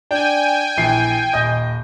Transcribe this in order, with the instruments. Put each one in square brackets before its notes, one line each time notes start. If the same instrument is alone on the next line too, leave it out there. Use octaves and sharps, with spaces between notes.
[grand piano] D4 [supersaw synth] G5 G#5
[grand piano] A#1 E3 C7
D#1 D#5 G6